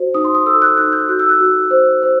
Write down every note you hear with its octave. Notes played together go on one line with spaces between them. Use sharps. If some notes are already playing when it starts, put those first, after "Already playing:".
Already playing: F#4 C5
D#4 D#6
C6
D#6
A4 E6
F#6
D#4 F#6
G6
F#4 F#6
E6
F#6
F#4
C5
C5